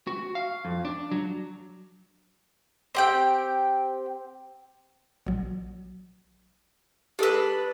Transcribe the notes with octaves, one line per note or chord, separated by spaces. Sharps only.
F#4
F5
F2
D4
F#3
C4 G4 G5
A#1 F#3
D4 G4 A4 B4 E6